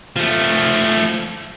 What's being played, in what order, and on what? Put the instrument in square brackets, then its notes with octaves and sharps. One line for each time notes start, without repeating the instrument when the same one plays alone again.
[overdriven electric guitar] F3 A3